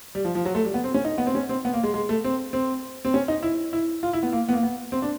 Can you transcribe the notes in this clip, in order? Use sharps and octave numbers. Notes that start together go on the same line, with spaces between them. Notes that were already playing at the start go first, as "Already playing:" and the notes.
G3
F3
F3
F#3
A3
G3
B3
C4
C#4
D#4
B3
C4
C#4
C4
B3
A#3
G#3
G#3
A3
C4
C4
C4
C#4
D#4
E4
E4
F4
E4
B3
A#3
B3
A#3
B3
C4
D4